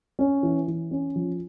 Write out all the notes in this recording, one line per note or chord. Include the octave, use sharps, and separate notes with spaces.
C#4
E3
E3
C#4
F3